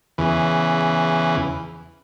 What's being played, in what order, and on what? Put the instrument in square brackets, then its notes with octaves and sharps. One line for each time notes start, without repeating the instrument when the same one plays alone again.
[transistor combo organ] E2 C#3 E3